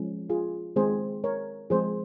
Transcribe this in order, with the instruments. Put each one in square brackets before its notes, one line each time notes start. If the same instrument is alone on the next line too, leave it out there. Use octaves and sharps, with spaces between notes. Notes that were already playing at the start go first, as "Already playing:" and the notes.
Already playing: [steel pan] F3 G#3 C#4
F4 G#4
D#3 G#3 C4 G#4 C5
A#4 C#5
F3 G#3 C4 G#4 C5